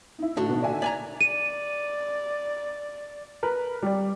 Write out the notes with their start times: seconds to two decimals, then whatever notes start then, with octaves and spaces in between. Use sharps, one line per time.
0.19 D#4 E4
0.37 A2 D3 F#4
0.49 A#1 B2 D#3
0.62 D5 E5 G#5
0.82 D5 G#5 A#5 G#6 B6
1.21 D5 D#7
3.43 A#4 B4
3.82 G3 D5